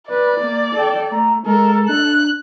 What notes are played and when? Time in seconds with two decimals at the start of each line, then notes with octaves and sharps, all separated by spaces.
0.10 B4 D5
0.40 A#3
0.75 A4 G5
1.12 A3 A#5
1.46 G#3 A4 A#4
1.89 D4 F#6